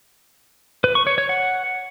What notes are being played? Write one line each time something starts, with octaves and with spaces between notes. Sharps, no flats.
B4
C#6
C#5
C#5
F#5